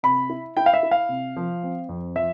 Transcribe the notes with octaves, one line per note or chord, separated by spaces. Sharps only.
C3 B5
E4
E4 G5
F5
E5
E4
F5
C3
F3
C4
F2
F3 E5